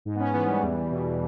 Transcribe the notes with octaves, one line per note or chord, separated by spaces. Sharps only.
G#2
B3
C#4
E3 B3
G3
E2
B2